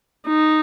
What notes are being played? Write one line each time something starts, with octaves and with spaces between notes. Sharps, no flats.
D#4